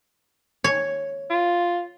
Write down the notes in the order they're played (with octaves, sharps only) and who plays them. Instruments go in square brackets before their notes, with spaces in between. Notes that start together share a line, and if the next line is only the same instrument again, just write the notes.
[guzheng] C#5
[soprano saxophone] F4